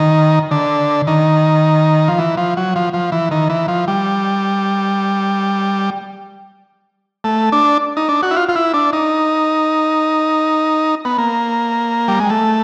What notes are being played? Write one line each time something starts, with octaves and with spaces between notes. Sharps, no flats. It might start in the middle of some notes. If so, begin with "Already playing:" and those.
Already playing: D#3
D3
D#3
F3
E3
F3
F#3
F3
F3
E3
D#3
E3
F3
G3
A3
D4
D#4
D4
F#4
E4
F4
F4
E4
D4
D#4
B3
A#3
G3
G#3
A3